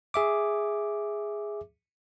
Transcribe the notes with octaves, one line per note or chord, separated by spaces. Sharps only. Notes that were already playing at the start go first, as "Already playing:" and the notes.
G#4 E5 D6